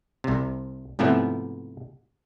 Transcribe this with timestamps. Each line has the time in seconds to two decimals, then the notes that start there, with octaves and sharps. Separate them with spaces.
0.24 C2 C3
0.99 G#2 C3 F3 A3 B3 E4